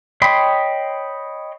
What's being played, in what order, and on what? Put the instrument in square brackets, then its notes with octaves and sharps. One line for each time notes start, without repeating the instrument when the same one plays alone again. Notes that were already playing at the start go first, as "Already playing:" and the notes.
[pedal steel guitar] C#5 D#5 G5 B5 C6